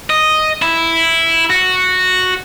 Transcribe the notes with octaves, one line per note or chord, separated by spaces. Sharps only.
D#5
E4
F#4